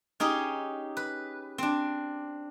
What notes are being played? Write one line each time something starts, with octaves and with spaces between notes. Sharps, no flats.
C#4 D#4 G4 G#4
B4
C4 D4